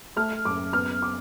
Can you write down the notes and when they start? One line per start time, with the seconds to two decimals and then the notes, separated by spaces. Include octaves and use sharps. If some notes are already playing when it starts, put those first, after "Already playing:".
0.16 A3 F6
0.45 F#1 D6
0.73 B3 F6
1.02 D6